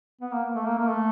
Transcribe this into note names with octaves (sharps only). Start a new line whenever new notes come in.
B3
A#3
A3
A#3
A#3
A3